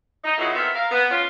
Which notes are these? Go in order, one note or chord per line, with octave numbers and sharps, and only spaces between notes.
D#4
A#2 C#3 D#4 E4 F#4 E5
B3 C4 A4 A#4 E5
A#4 F5
B3
C#4 F4